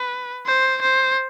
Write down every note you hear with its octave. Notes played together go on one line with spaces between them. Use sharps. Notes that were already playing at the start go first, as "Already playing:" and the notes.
Already playing: B4
C5
C5